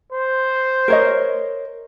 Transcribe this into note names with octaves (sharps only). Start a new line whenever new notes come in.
C5
A#4 C#5 D#5